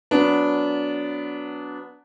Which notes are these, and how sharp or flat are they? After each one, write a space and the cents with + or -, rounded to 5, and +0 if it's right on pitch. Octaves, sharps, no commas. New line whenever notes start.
F#3 -10 B3 +0 D4 -20